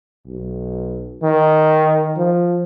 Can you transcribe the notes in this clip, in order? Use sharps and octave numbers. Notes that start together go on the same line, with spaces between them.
B1
D#3
F3